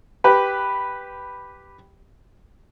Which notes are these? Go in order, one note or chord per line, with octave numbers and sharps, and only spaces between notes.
G4 B4